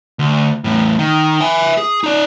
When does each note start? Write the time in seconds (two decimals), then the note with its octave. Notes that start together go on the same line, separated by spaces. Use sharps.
0.19 D2
0.64 E2 A2
0.99 D#3
1.41 E5 G#5
1.78 G#4
2.04 D#4 D5